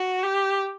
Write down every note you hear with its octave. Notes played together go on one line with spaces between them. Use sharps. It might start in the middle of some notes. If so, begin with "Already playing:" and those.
Already playing: F#4
G4